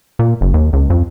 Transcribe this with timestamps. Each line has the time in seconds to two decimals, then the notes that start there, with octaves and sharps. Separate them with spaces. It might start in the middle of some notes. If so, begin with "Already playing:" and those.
0.19 A#2
0.41 F#1
0.54 D#2
0.73 C#2
0.90 F2